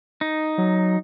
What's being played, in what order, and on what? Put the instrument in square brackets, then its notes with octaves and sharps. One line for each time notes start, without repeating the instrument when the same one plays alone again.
[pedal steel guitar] D#4
[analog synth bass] F#3